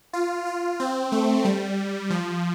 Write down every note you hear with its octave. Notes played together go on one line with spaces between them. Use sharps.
F4
F4
C4
A3
G3
F3